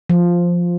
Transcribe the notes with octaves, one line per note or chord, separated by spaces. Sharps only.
F3